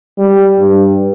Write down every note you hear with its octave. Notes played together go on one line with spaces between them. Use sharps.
G3
G2